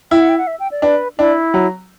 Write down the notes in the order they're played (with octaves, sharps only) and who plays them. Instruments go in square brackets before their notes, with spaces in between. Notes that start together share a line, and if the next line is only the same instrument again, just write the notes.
[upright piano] E4 [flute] G5
[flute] F#5
G5
F#5
E5
G5
D5
[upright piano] D4 [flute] B4
[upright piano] D4 [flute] E4
[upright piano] F#3